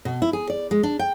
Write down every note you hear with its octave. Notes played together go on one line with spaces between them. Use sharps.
B2
E4
G#4
D5
G#3
D4
G5